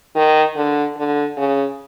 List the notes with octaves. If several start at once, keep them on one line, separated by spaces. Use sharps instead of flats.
D#3
D3
D3
C#3